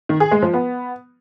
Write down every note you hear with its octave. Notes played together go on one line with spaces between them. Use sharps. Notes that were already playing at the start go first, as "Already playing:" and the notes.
D#3
G#4
G#3
F3
B3